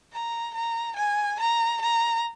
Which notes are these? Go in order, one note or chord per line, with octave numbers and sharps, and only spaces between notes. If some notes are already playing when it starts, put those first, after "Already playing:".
A#5
A#5
G#5
A#5
A#5